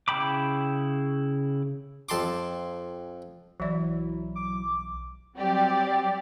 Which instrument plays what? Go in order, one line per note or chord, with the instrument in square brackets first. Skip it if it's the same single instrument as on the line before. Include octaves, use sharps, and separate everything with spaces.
[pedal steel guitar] C#3 E4 G5 B5 D6
[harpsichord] F2 A5 C6 D6
[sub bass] B1 [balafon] E3 D5 [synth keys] F#3 E4
[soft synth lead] D6
[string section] F#3 G3 C4 G4 D5